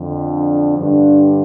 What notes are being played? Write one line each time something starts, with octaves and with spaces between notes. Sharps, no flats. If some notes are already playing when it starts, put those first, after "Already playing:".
Already playing: F2 D3
D4
G2 D3 D4